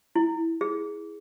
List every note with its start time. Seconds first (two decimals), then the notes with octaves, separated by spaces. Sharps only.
0.16 E4
0.61 G#4